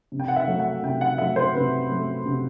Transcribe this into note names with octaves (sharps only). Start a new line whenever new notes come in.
C3
G5
F#5
E5
F#3 A3
F#5
C3 G5
F#5
F#3 A3 E5
C5
C3 B4
F#3 A3
C3